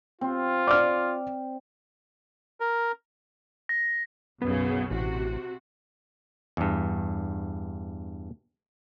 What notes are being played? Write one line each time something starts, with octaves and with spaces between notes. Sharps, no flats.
C4 F4
D5 D6 F6
A#4
A#6
B1 F#2 C#3 B3
A1 C3 F#4
E2 G2